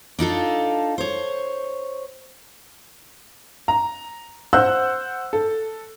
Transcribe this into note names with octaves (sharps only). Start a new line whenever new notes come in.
D4 D#4 F4 A4
C5 C#5
A#5
C5 F#5 E6 F#6 G6
A4